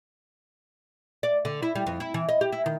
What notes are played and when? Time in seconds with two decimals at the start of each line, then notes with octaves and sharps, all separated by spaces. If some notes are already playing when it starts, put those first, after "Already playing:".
1.23 D5
1.45 D3
1.62 E4
1.75 G3
1.87 F2
2.00 E4
2.14 E3
2.29 D#5
2.41 G4
2.52 E4
2.66 D#3